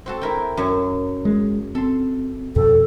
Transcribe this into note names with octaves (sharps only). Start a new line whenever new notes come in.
C4 F#4 A4
E4 A#4 G5
F#2 C#5
G#3
C4 A4 C6
F2 B2 A4